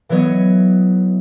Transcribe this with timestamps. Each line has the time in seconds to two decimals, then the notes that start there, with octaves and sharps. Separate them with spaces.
0.09 E3 F#3 B3 C#5 D#5